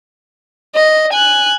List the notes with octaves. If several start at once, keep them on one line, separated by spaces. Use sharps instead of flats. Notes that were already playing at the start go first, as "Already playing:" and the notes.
D#5
G#5 F#6